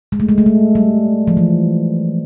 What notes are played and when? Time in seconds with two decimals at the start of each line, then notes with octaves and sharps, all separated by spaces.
0.12 G#3
0.20 A3
0.29 G#3
0.38 A3
0.46 G#3
0.75 G3
1.28 F3
1.37 E3